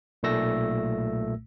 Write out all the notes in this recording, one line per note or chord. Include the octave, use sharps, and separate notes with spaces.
B1 A#2 A3 E6 A#6